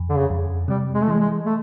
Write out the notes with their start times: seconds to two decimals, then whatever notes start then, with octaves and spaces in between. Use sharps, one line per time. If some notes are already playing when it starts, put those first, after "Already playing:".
Already playing: F2
0.09 D3
0.17 C#3
0.30 F2
0.68 C3 G3
0.94 G#3
1.02 A3
1.07 E3 G#3
1.20 G#3
1.46 A3